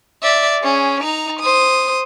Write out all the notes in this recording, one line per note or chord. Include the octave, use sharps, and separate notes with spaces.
D5 E5
C#4 G#4
D#4 A#5
C5 D#6